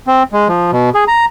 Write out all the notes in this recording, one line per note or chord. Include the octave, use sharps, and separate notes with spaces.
C4
G#3
F3
B2
G#4
A#5